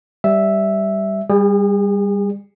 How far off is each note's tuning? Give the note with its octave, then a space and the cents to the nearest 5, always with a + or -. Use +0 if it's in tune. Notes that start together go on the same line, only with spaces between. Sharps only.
G3 +0 E5 +0
G3 +20 G#4 -35